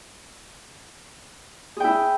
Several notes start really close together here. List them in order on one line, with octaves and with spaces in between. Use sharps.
G#4 G5 E4